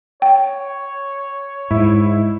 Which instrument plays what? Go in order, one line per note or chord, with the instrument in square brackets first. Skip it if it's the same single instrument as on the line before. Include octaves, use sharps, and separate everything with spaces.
[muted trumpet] C#5 [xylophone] G5
[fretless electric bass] G#2 [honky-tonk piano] E4